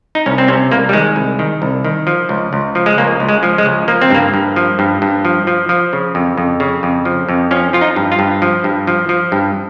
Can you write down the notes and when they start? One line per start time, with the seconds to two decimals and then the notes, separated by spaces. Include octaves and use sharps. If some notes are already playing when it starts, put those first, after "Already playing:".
0.15 D#4
0.26 C2 C#4
0.38 C4
0.48 C3 C#4
0.71 C2 A#3
0.89 G3
0.93 D#3 G#3
1.16 C2
1.39 D#3
1.62 C2
1.85 D#3
2.07 F3
2.29 C#2
2.53 C#2
2.75 F3
2.86 G#3
2.98 C#2 A#3
3.20 C#2
3.29 G#3
3.43 F3
3.58 G#3
3.66 C#2
3.88 F3 A#3
4.02 C4
4.10 G2 A#3
4.34 G2
4.56 F3
4.79 G2
5.02 G2
5.25 F3
5.47 F3
5.69 F3
5.93 C#3
6.15 F2
6.37 F2
6.60 C#3
6.83 F2
7.05 F3
7.29 F2
7.51 F3 C#4
7.73 F3 F4
7.81 D#4
7.96 G2
8.12 F4
8.19 G2
8.42 F3
8.64 G2
8.87 F3
9.09 F3
9.32 G2